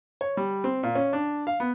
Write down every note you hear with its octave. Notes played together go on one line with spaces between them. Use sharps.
C#5
G3
C4
A#2
C#4
D4
F5
B3